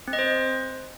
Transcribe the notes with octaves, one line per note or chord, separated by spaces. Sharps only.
C4
D#5
C5